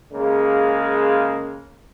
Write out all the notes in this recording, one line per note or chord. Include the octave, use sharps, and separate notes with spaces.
C#3 G#3 A#3